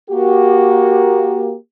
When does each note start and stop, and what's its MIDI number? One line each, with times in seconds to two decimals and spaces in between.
0.11 1.55 58
0.11 1.55 66
0.11 1.55 67